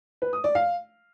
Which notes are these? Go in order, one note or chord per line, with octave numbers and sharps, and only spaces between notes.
B4
D#6
D5
F5